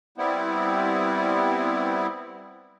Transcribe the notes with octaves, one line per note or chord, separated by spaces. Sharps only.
G3 B3 C4 E4